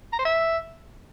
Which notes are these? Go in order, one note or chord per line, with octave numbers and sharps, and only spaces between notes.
A#5
C5
E5